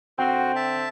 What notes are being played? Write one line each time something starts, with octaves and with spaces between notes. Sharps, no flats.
D3 C4 F#4 G5
E5 A5